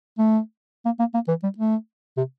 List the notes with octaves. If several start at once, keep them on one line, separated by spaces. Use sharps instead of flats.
A3
A#3
A#3
A#3
E3
G3
A3
C3